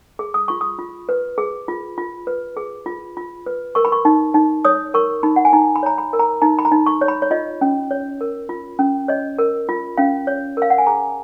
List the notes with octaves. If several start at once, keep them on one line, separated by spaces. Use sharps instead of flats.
G#4
D#6
F4 C#6
D#6
F4
B4
G#4
F4
F4
B4
G#4
F4
F4
B4
A#4 C#6
B5
C#6
D#4
D#4
C#5 D#6
A#4 C#6
D#4 B5
F#5
G#5
D#4 A#5
B5
C#5 A#5
B5
A#4
A#5
D#4 A#5
B5
A#5
D#4
C#6
C#5
B5
C#5
F4 D#5
C#4
C#5
A#4
F4
C#4
C#5 D#5
A#4
F4
C#4 F5
C#5
A#4 F5
F#5
G#5
G#4 A#5